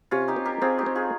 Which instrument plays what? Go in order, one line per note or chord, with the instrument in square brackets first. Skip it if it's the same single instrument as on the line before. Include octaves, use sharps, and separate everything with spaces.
[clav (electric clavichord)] C3 [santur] C#4 F4
[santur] D#4 G4
[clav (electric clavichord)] C4
[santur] G4 A#4
[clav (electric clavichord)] C4 [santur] F4 G#4
[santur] D#4 G4
[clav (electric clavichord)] C4
[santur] F4 G#4